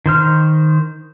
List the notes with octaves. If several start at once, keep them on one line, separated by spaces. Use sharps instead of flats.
D#3 C5 F6